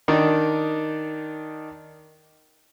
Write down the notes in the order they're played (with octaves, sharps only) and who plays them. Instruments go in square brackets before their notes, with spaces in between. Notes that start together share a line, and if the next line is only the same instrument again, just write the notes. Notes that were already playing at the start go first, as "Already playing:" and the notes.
[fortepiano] D#3 D4 D#4